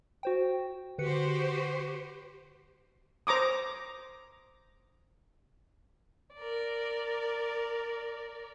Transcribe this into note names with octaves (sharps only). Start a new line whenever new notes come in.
F#4 C5 G5
D3 F#4 G4 B4 C5 C#7
C5 A#5 D6 D#6
A#4 D5